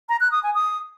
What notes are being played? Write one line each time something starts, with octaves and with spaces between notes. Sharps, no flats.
A#5
F#6
D#6
G#5
D#6